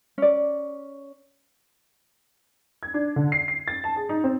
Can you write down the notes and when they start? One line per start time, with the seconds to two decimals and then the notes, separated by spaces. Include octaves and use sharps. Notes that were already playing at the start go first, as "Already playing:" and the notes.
0.18 C#4 D5
2.83 G#6
2.94 D4
3.16 D3
3.32 C7
3.48 C7
3.68 A6
3.84 A5
3.96 G#4
4.09 D#4
4.24 C4